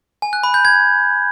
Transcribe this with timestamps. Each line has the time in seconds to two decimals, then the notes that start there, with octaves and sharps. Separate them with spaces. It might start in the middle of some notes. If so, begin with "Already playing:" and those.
0.22 G#5
0.33 F#6
0.43 B5
0.54 G6
0.65 G#6